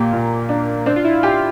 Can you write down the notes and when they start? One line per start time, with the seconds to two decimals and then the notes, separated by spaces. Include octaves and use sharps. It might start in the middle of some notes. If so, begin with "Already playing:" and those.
Already playing: A#2 A#3 G4
0.13 A#2
0.49 D4
0.86 C4 D4
0.96 F4
1.04 E4
1.23 F4 G4